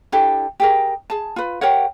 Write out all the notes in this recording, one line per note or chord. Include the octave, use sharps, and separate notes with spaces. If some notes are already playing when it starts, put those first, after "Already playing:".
D4 E4 G4 A4
G4 G#4 A#4
G#4 A5
F4 B4
G4 A#4 C#5 F#5